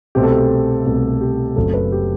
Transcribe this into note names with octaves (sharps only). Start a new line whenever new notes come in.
C2 B2 A3 C4 G4
A4
G4
C2 B2 A3 C4
G4
F#1 F#2 F#3 A3 C4 A4
B4
G4